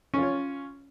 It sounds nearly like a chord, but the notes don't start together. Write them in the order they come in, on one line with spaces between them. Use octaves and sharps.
C#4 F4 C#5